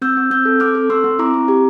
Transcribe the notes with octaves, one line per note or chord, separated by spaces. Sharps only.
C4 E6 G6
C4
C4 E6 G6
A4
C4 D6 F6
A4
C4 C6 E6
C4
E4 A#5 D6
C4
G4